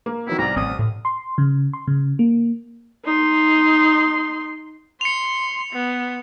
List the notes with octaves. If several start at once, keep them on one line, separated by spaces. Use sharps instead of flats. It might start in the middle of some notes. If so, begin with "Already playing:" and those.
A#3
D#3 F#3 B3 E4
C2 D5 A#5
A1 C4 D#6
A2
C6
C#3
C6
C#3
A#3
D#4 C6
C6 C#7 F7
B3